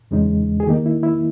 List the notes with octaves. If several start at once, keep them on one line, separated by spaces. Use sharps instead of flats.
E2 C#3 G#3 D#4
G#4
D#3 A#3 D#4 G4
E4
E4